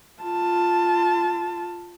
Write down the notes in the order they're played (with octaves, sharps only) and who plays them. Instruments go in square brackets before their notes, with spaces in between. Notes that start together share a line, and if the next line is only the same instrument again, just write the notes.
[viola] F4 A5